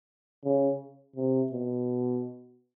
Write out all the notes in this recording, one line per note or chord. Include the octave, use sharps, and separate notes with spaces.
C#3
C3
B2